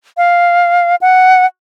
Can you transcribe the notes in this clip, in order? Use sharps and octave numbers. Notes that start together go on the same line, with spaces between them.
F5
F#5